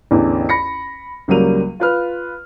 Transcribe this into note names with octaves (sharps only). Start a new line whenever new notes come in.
A1 E2 D3
B5 A#6 C#7
C#2 F#3 G3 A#3 D#7 F7
F4 B4 F6